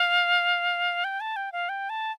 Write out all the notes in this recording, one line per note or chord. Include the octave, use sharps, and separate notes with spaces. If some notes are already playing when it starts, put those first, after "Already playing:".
Already playing: F5
G5
A5
G5
F5
G5
A5